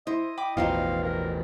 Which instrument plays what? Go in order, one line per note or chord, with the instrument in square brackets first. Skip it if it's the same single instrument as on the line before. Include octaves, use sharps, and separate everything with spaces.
[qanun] E4 [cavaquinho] C5 [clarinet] D#5
[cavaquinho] G5 B5 D6
[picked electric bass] A1 E2 [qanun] B2 F3 C6 [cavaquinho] D#4 G4 [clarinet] F5
[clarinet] A#4